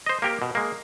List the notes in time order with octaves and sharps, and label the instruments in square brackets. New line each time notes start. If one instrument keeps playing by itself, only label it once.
[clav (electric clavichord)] C5 D#5
A#3 G4 A#4
B2
G#3 A#3